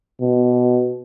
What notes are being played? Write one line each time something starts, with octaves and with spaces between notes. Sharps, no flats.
B2